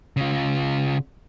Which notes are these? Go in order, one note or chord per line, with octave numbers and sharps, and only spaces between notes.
C#3 F4